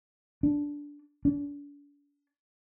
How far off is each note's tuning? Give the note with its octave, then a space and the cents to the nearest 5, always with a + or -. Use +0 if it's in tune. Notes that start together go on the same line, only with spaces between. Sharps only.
D4 -15
D4 -40